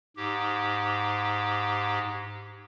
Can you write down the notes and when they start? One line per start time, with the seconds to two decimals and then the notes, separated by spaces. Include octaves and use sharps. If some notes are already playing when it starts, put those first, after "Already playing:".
0.16 G#2 G4